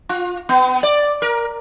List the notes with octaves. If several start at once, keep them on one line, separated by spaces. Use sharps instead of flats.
F4
B3
D5
A#4